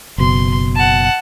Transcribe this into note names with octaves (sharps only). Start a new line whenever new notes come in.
F#1 B2 C6
F#5 A5